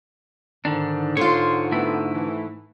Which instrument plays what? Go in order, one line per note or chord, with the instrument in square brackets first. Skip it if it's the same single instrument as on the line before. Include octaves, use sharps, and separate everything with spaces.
[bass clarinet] G#2 [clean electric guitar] D3 D#3 D4
[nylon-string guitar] D3 F4 [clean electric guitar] C#5 [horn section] C6
[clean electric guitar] A3 E4 [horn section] B3 C4
[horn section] E3